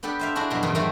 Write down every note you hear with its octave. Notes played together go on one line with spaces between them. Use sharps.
B3 D4 G4 A4 B4
C5 E5 F5
D4 E4 F#4 G#4
F2 B2 F#3
E2 G2 A#2 C#3 C4
D#3 F#3 A3 G#4 A4 E5